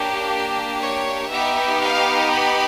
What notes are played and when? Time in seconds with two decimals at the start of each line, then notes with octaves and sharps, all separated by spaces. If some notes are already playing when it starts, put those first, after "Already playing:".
Already playing: A#3 D4 G4 C#5
0.78 C#5
1.29 B3 D#4 G4 E5
1.80 F5
2.31 B5